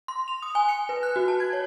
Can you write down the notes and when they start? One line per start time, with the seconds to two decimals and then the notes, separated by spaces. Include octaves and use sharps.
0.08 C6
0.28 F7
0.42 D#6
0.55 G#5
0.69 C#7
0.89 B4
1.03 F#6
1.16 F#4
1.28 A5
1.40 G#6
1.53 C#5